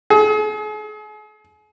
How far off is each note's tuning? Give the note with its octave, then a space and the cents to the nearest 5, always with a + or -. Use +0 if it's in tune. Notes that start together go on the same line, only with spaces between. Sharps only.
G#4 +40